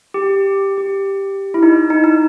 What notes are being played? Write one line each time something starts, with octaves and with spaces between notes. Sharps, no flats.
G4
G4
E4
D#4
D#4
D#4